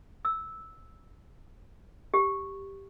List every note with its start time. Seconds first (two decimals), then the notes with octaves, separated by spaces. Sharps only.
0.25 E6
2.14 G4